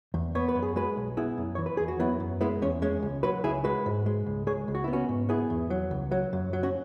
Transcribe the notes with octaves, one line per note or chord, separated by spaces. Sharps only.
E2
B3 C#5
B4
F#2
G#4
G#3 F#4 B4
B1
B3 E4 G#4
F#2
E3 C#5
B4
E2 G#4
F#4
F#3 B3 E4
F#2
G#3 B3 E4
E2 C#4
G#3 C#4
C#2
F#3 F#4 B4
C#2 E4 G#4
G#3 F#4 B4
G#2
G#3
C#2
G#3 G#4 C#5
C#2
F#4
E4
B3
C#4 F#4
G#2
B3 E4 G#4
E2
F#3
C#2
F#3
F#2
F#3
C#4 F#4